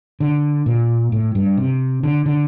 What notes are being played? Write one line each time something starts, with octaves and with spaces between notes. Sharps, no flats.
D3
A#2
A2
G2
C3
D3
D3